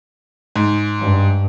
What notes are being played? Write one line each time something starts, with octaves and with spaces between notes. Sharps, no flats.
G#2
G2